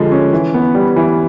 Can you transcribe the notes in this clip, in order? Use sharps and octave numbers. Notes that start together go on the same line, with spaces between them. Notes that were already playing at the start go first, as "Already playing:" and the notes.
Already playing: D3 F3 G3 G#3
C#4
E3
B3
G3
E3